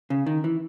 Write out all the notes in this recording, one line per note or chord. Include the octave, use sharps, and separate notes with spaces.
C#3
D#3
E3